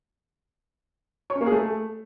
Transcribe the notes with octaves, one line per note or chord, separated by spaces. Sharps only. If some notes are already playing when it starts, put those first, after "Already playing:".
C#5
C#4
A#3
G#4
A3